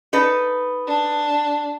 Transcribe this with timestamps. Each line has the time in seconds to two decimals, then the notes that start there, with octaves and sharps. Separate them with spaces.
0.13 D#4 A4 B4
0.87 D4